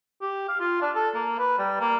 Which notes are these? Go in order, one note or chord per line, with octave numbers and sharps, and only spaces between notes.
G4
F5
F4
D4
A4
A#3
B4
G3
A#3